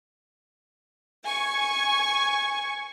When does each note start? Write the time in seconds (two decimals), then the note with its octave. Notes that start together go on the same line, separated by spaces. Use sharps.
1.25 G#5 C#6